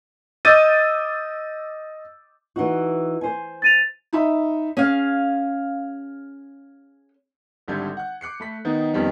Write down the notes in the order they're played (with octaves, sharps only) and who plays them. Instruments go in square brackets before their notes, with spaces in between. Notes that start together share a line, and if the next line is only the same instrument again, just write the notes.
[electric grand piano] D#5 D6 E6 G6 A6 D#7
[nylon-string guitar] E3 D#4 F#4
C5 G#5
[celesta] A6 D#7 F7
[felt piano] D#4 E5 B5
[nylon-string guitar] C#4 [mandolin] G#4 F5
[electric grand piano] G#1 D3 G3 A4 G6 G#6
F#5 F#6
D6 F#6 C7 C#7
A3 B5 B6
D#3 B3 D#4
F2 D#3 G3 B3 C#4